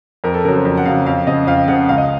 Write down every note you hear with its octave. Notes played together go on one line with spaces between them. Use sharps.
F2 A#4
A4
C#3 F#3 A#4
C5
F2
F#5
C#3 F#3 F5
F2 F5
C#3 F3 D#5
F2 F5
C#3 F3 F#5
C#2 F5
D#5